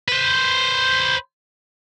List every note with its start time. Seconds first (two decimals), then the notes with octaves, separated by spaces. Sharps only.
0.08 B4 C5